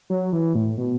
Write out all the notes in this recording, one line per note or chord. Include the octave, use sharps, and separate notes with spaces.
F#3
E3
A2
B2